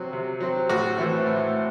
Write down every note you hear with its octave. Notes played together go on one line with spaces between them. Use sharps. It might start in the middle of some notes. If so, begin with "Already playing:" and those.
Already playing: C3 F#3 C4
C3
F#3 C4
A2 F#4
E3 A3 C4
A2